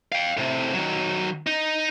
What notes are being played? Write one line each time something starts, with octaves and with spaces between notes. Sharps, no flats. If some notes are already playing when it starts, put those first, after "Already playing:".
F5 G5
A2 C3
D#3 F#3
D#4